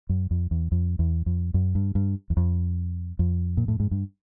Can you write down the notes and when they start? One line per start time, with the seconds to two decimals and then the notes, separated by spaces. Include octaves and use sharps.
0.09 F#2
0.31 F2
0.51 E2
0.72 F2
0.99 E2
1.26 F2
1.54 F#2
1.75 G2
1.95 G2
2.30 E2
2.37 F2
3.19 F2
3.57 A#2
3.68 A2
3.80 G#2
3.91 G2